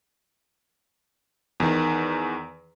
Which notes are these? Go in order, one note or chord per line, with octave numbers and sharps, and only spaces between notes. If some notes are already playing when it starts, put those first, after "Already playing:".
E2 D#3